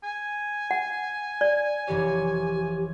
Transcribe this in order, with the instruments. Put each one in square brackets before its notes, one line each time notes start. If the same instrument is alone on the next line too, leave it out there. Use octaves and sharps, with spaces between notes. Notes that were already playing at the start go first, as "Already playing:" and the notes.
[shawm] G#5
[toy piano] F#5
D5
[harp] F1 E3 C#5 [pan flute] G4